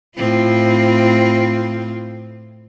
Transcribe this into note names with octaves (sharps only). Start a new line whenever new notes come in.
A2 C4 F4